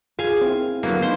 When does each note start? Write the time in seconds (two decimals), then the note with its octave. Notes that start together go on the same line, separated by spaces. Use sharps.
0.19 F4 G#4 F5 G#5
0.41 C4 E4 A#4
0.83 D3 F#3 A#3 B3
1.02 A3 C#4 D#4 C5